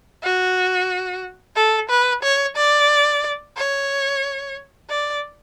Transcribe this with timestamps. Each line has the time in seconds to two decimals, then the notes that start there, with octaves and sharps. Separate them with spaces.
0.23 F#4
1.56 A4
1.89 B4
2.23 C#5
2.56 D5
3.57 C#5
4.90 D5